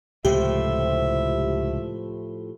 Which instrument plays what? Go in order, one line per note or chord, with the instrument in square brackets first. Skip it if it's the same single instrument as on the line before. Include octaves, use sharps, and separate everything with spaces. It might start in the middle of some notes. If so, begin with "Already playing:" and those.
[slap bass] C#2 C3 G#3 [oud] A2 F3 [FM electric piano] G4 [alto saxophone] E5